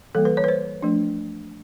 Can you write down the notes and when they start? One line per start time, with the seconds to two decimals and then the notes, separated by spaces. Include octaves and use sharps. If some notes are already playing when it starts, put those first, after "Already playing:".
0.15 E3 G3 A#3 A4
0.25 B4
0.37 C#5
0.44 B4
0.48 C5
0.82 F3 A3 D4